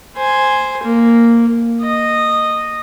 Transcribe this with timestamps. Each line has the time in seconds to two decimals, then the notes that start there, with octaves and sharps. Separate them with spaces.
0.17 C5 G#5
0.83 A#3
1.82 D#5